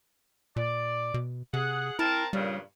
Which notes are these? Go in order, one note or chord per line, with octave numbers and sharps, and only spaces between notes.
A#2 D5
B2
C3 G#4 F#5
C4 E4 A#4 A5
G2 A#2 C#3 G3